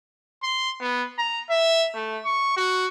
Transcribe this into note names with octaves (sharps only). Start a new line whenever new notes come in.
C6
B3
A#5
E5
A3
C#6
F#4